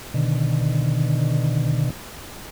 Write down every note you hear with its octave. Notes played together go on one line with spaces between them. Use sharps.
B2 D3 D#3